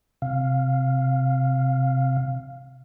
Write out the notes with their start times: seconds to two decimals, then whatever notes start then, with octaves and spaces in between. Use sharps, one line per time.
0.22 C3 F5